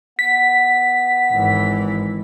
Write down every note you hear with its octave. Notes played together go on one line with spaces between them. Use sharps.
B3 B6
G#1 E3